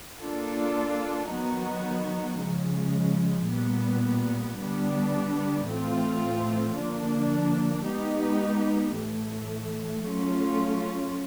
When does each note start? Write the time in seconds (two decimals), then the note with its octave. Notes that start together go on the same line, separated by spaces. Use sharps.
0.20 A#3 D4 F4 A4
1.30 D#3 F#3 B3 D#4 F#4
2.40 C#3 F3 G#3
3.49 A#2 G3 B3
4.57 D3 G3 B3 D4
5.67 A2 E3 A3 C4 F4
6.77 D3 F3 A#3 D4
7.86 G#3 B3 D#4 G4 B4
8.95 A2 E3 A3
10.05 F#3 A3 C#4 F4